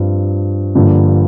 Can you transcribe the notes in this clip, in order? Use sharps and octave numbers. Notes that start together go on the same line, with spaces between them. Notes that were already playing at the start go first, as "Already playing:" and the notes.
Already playing: G2 F3 C4
G2 D3 F3 A#3